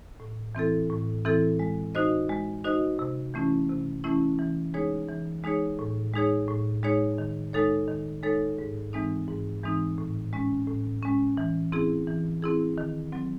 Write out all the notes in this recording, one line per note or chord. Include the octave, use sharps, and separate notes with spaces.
A2
E3 C4 E4 A4
A2
E3 C4 E4 A4
G#3
D#4 F#4 C5 D#5
G#3
D#4 F#4 C5 D#5
C3
E3 A3 C#4 E4
C3
E3 A3 C#4 E4
E3
G#3 D#4 G#4 C#5
E3
G#3 D#4 G#4 C#5
A2
G#3 D#4 G#4 C#5
A2
G#3 D#4 G#4 C#5
D#3
G#3 D#4 A4 C#5
D#3
G#3 D#4 A4 C#5
G#2
E3 G#3 C4 D#4
G#2
E3 G#3 C4 D#4
A2
G#3 C#4
A2
G#3 C#4
E3
C4 E4 G#4
E3
C4 E4 G#4
D#3
F#3 C4